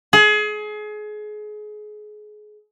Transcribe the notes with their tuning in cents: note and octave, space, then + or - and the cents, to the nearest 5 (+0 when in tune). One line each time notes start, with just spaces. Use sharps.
G#4 +30